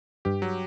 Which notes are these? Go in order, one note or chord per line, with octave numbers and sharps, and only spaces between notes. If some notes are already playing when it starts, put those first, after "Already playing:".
G2 G4
F#3